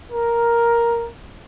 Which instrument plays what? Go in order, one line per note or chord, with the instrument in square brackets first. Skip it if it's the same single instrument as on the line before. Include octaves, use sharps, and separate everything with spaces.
[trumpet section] A#4